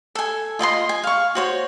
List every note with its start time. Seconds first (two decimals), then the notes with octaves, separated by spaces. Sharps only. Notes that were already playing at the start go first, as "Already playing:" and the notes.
0.15 A4 G#5
0.59 F4 D#5 G#5 C6
0.89 G#5
1.04 F5 C#6
1.35 F#4 C5 C#5